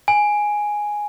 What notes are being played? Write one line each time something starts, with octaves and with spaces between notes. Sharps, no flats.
G#5